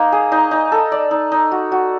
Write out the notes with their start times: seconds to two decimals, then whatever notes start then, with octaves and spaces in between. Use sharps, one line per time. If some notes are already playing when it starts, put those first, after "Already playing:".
Already playing: A#3 D#4
0.12 G#4
0.32 D#4
0.51 D#4
0.72 A4
0.92 D5
1.11 D#4
1.32 D#4
1.51 F#4
1.72 F#4